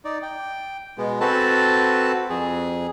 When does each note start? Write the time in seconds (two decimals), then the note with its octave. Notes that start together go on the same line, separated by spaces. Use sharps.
0.05 D#4 D5
0.22 G5
0.98 B2 G#3 B3
1.21 C4 F#4 A4 B4 A5
2.30 F2 G#4